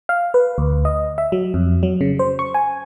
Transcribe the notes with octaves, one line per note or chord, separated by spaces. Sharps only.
F5
B4
D2
D#5
E5
F#3
F2
F#3
C#3
C5
C#6
G#5